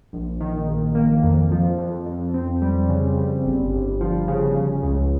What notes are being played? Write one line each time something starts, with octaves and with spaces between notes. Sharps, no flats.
A#1
D#3
A#1
A#3
F2
F3
F2
F2
C4
G3
C#3
G3
G1
G1
F3
C#3
C#3
C#2